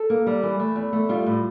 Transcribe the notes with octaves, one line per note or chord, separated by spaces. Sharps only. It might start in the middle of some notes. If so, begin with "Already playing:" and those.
Already playing: A4
A#3
G3
E3
A3
E2
A3
G3 F4
A2